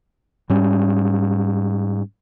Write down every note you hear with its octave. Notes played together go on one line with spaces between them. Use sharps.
G#2 G3 C#4